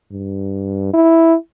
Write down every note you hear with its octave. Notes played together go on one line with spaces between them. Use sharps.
G2
E4